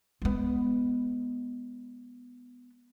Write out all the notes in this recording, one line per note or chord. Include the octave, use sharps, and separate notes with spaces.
G#3 B3